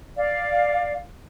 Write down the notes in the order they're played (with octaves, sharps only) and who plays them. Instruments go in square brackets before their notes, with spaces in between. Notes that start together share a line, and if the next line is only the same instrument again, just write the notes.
[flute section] D5 F5